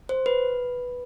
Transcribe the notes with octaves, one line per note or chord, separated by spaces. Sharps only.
C5
B4